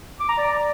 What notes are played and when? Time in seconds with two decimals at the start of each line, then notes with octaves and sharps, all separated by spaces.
0.20 D6
0.29 A#5
0.37 D5